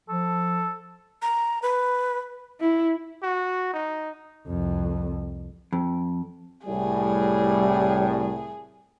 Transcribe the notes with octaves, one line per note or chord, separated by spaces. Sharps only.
F3 A4
A#5
B4
E4
F#4
D#4
C2 F2
F2
C2 A2 G3 G#4